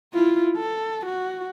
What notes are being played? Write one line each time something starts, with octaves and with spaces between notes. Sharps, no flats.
E4 F4
A4
F#4